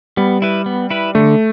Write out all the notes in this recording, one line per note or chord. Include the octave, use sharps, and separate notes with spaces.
G3 B3
E4 B4
B3
E4 B4
D3 A3